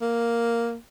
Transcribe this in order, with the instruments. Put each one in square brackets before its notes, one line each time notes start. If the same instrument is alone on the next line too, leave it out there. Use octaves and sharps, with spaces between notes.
[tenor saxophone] A#3